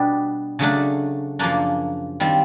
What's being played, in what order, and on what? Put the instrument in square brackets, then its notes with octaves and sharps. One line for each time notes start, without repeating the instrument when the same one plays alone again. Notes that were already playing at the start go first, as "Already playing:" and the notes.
Already playing: [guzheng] B2 G3 B3 D4 G4
C#3 F#3 A3 D4
F#2 C#3 F3 A#3 D4
D#3 G3 C4 F4